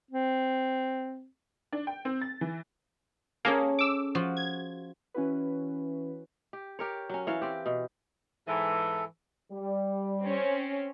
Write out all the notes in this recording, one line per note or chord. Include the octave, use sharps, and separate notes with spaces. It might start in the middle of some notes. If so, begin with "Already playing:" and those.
C4
D4
G5
C4
A6
E3
A#3 C#4 G#4 A4
D6 E6
F3 F4 F#4
G#6
E3 C#4 E4 F#4 B4
G4
G4 A#4 C#5
F#3 C#4
E3 C#5 F5
C4 G4
B2
G#2 E3 A4
G3
C4 C#4